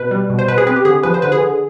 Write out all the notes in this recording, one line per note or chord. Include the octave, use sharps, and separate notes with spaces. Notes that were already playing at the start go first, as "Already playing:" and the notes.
Already playing: B2 B4
G3
B2
C5
B2 B4
G#4
C4 B4
G4
D3 G#4
F3 B4
C5
D3 B4
G#4
D3